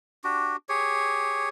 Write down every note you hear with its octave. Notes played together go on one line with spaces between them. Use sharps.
D4 F#4 G4
G4 G#4 C#5